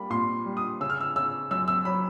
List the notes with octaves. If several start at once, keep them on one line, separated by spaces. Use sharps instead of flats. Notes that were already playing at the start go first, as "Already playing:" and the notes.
Already playing: G3 A#3 B5
A#2 C6
G3
D#6
C#3 E6
F6
E6
C#3 E6
F#2 E6
E6
F#3 B5